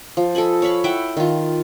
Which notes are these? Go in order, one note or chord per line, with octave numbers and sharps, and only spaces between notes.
F3
A4 D#5 G#5 B5
C#5 F5 B5 C#6
E4 E5 F#5 G5
D#3 F4